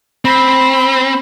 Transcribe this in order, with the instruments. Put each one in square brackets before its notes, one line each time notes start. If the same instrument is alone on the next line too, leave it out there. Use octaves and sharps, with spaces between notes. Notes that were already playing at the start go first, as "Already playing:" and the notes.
[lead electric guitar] C4 [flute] B5